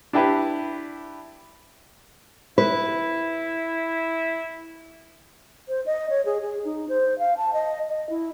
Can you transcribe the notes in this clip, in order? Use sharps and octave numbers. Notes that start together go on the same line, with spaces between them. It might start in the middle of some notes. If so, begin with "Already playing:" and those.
D4 E4 G4 B4
E4 B4
C5
D#5
C#5
G#4
G#4
D#4
C5
F5
A5
D#5
D#5
E4